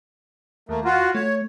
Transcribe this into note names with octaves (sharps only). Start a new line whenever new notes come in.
D#2 A3 A#3
F4 F#4
A3 C#5